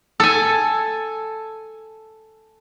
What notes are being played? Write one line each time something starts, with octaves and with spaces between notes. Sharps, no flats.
A4 G#5